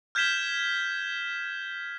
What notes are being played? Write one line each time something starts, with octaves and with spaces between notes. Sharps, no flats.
F6 G6 G#6 B6 E7 G7